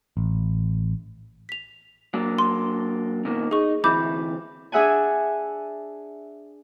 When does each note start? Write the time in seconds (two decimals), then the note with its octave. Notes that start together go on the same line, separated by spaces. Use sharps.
0.17 A1
1.49 B6 F7
2.14 F#3 A#3 D4
2.39 C6
3.25 B2 D#3 A#3
3.51 D#4 G#4 C#6
3.84 D2 C3 E3 B5 D6 G6
4.72 D4 G#4 E5 F#5 G#5